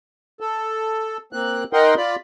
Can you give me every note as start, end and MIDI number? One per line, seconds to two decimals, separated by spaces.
0.40 1.17 69
1.33 1.64 58
1.33 1.64 60
1.33 1.64 90
1.73 1.94 63
1.73 1.94 70
1.73 1.94 75
1.73 1.94 78
1.73 1.94 79
1.73 1.94 84
1.97 2.16 65
1.97 2.16 74
1.97 2.16 83